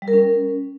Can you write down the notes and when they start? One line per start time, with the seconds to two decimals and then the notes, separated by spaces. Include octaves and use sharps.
0.02 G3
0.08 A#4
0.13 C#4